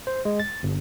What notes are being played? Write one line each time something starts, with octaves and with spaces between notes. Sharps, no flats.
C5
G#3
A6
G1